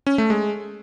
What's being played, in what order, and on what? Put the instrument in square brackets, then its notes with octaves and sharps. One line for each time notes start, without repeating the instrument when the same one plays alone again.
[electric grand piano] C#4
A3
G#3